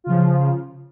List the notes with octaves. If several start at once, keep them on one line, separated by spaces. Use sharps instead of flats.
C#3 F3 F4